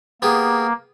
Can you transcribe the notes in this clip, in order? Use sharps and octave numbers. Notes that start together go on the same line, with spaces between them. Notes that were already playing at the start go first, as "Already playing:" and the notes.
A#3 B3 G4 G#4